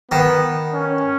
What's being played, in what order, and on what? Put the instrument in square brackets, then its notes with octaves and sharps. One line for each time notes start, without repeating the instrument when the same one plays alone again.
[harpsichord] D#3 [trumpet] B3
[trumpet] C#4